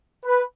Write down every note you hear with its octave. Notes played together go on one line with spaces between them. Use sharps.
B4